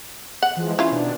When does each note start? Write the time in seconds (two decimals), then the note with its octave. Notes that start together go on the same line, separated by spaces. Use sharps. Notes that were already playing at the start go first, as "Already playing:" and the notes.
0.43 F#5
0.57 E3 F3 G#3
0.79 C#4 E4 F4
0.92 B2 D#3 D4